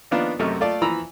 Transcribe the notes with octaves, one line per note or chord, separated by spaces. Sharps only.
D#3 F3 A#3 B3 D4 F4
F#2 C3 A3 F#4 D#5 F6
A3 F4 D5 A5
E3 F3 A#5 B5 E6